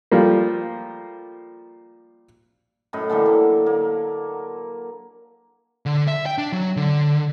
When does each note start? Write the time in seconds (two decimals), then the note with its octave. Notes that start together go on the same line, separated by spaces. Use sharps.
0.12 F3 G3 A3 A#3
2.93 F#2 A2 D#5 B5
3.10 D3 E3 G3 A#3
3.26 F#3
3.66 A#3
5.86 D3
6.07 E5
6.26 G5
6.38 D4
6.53 F#3
6.77 D3